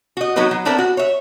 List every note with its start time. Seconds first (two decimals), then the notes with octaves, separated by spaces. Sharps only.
0.17 F#4 D#5
0.36 F#3 B3 D#4 F#4 B4 D#5
0.51 F#3
0.65 B3 C4 D4 E4 A4 A#4
0.78 F#4
0.97 C#5 E5